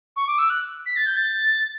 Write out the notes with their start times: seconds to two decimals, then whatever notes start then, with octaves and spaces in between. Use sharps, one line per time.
0.16 C#6
0.27 D6
0.38 E6
0.50 F#6
0.86 B6
0.96 A6
1.06 G6
1.17 A6